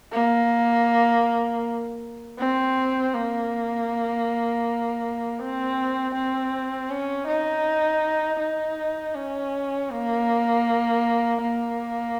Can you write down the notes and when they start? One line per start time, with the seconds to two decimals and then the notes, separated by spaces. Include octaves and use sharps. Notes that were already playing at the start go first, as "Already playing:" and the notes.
0.12 A#3
2.39 C4
3.14 A#3
5.40 C4
6.15 C4
6.91 C#4
7.28 D#4
8.40 D#4
9.15 C#4
9.91 A#3
11.41 A#3